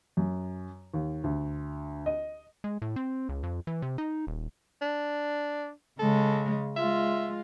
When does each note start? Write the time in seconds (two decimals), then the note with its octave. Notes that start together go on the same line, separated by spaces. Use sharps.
0.17 F#2
0.94 D#2
1.24 D2
2.06 D#5
2.64 G#3
2.82 A2
2.96 C4
3.29 C#2
3.43 F2
3.67 E3
3.82 C3
3.98 D#4
4.27 D#1
4.82 D4
5.99 C#3 G#3 A4
6.76 G#3 F4 E5